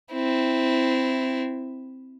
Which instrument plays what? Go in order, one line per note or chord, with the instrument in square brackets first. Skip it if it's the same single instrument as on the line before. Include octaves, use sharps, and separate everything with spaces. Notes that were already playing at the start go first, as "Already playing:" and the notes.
[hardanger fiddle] C4 E4